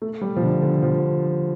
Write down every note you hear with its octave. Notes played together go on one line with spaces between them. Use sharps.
A3
G3
F3
D3
D3
F3